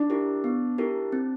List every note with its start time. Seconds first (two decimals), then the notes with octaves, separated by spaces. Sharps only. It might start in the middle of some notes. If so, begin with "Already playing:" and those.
Already playing: D4
0.10 E4 G4 A#4
0.44 B3
0.78 E4 G4 A#4
1.12 C4